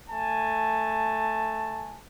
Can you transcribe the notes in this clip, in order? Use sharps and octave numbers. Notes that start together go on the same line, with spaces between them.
A3 G#5 A5